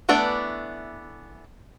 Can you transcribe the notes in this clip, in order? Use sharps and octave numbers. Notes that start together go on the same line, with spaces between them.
E3 A3 B3 D4 D5